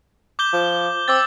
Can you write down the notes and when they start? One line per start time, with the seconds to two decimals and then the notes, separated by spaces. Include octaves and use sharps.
0.39 D6 G6 G7
0.53 F3
1.08 C4 D6 E6 A6